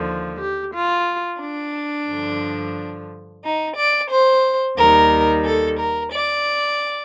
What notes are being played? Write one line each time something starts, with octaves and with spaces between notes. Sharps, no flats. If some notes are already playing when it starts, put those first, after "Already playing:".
Already playing: D#2 D3 F3
G4
F4
D4
G2 D3 F3
D#4
D5
C5
D#2 D#3 G3 A#4
A4
A#4
D5